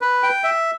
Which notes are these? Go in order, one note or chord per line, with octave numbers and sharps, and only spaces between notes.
B4
G5
E5